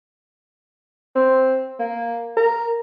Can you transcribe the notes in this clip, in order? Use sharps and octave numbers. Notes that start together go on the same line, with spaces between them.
C4
A#3
A#4